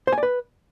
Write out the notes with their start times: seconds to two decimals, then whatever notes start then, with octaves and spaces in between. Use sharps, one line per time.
0.07 C5
0.13 G#5
0.18 D5
0.23 B4